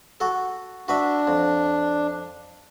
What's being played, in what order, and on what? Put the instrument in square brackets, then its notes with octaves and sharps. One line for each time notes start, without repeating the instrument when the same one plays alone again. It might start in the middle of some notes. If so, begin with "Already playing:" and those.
[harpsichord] F#4 A4
[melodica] D4 [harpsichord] F#4 B4 E5
[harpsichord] F2